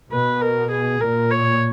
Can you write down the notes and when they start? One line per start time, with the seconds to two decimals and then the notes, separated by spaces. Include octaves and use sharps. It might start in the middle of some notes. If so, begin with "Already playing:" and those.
0.10 B2 B4
0.41 A#4
0.71 G#4
1.00 A#2 A#4
1.31 C#5